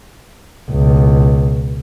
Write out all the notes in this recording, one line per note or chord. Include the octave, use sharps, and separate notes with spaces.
C#2 B2